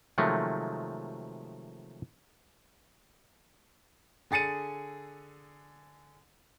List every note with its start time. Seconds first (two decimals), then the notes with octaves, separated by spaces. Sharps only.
0.18 C3 D#3 F3 F#3 G#3 A3
4.31 D3 G#4 A6 C#7 D#7